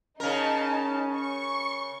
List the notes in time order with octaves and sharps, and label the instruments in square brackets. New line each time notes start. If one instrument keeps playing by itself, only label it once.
[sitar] C#3 A#4 [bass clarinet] C#4 [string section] D#4 A5
[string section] C#6